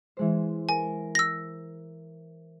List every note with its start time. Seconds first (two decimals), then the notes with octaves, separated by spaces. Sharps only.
0.17 E3 G#3 C5
0.69 A#4 G#5
1.15 E6 A#6